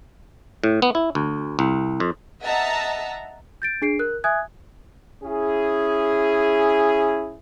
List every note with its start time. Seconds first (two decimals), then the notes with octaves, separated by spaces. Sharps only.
0.64 A2
0.82 B3
0.95 E4
1.15 D2
1.59 C2
2.00 F2
2.42 D#5 E5 F#5 A5 A#5 E6
3.62 G6 A6 D7
3.82 D4 G#4 C7 D7
3.99 A#4 F#6
4.24 E5 G#5 D#6 F#6 G#6
5.23 C#4 E4 G#4